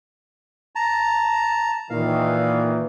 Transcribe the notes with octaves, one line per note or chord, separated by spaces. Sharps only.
A5 A#5
A#2 D#3 E3 F5